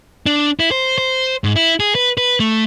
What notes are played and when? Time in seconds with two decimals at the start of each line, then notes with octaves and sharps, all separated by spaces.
0.26 D4
0.60 E4
0.71 C5
0.98 C5
1.44 G#2
1.56 E4
1.80 G#4
1.95 B4
2.18 B4
2.40 A3